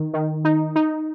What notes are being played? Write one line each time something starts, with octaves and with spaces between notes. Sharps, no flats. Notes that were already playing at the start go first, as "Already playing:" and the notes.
Already playing: D#3
D#3
D#4
D#4